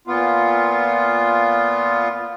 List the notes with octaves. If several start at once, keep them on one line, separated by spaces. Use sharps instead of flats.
A#2 B3 F4